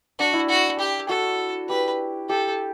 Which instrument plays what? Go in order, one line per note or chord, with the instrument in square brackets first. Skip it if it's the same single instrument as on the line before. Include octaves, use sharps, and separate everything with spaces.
[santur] D4 [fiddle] F#4
[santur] E4
[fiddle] F#4
G4
[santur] F#4 [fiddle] A4
[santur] G4 [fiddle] B4
[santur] G4 [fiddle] A4